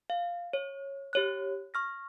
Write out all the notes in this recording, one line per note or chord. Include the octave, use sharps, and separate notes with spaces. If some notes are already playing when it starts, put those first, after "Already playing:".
F5
C#5
G4 C#5 F#6
C#6 F6 A#6